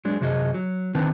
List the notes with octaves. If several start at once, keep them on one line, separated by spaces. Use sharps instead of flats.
F#3 G#3 D4
F#2 C3 F#4 G#4 D#5
F#3
D3 D#3 C4 D#4 B4 A5